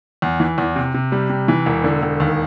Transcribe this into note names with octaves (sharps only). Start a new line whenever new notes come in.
E2
E3
E2
C3
C3
G3
C3
E3
E1
D3
E1
D#2